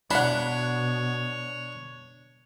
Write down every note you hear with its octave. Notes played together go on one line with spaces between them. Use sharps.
B2 D4 C#5 F#5 B5